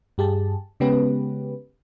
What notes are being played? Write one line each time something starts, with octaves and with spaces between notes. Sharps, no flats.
G2 G4 G#4 A5
C#3 G#3 B3 C#4 G4 B4